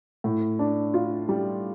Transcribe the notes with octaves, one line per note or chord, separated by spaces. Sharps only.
A2
D4
F4
G3